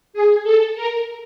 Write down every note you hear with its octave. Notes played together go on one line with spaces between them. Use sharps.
G#4
A4
A#4